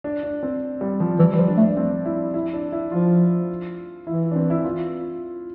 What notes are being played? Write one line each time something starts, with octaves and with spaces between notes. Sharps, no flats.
D4
D4
C4
G3
F3
E3 G3
F3 G3
D4
A3
D4
C4
E4
E4
D4
E4
F3 F4
E3 E4
D4
C4
E4
F4